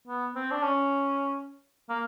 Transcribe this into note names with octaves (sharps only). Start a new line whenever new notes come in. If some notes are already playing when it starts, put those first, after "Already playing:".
B3
C4
D4
C#4
A#3